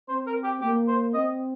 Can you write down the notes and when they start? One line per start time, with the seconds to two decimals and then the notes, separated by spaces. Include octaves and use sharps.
0.09 C4 C5
0.27 A#4
0.44 G4
0.61 A#3 G4
0.88 C5
1.14 C4 D#5